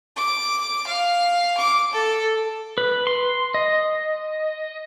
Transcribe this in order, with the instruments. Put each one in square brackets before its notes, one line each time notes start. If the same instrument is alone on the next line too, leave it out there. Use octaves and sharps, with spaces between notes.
[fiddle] D6
F5
D6
A4
[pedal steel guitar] B4
C6
D#5